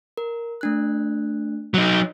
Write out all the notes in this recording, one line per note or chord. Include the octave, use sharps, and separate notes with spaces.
A#4
A3 D4 F#6
F#3 D#4